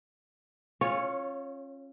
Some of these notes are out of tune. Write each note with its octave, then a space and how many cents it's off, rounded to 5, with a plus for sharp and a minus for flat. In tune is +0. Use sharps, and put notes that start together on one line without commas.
C#4 -30 F4 +10 C#5 +0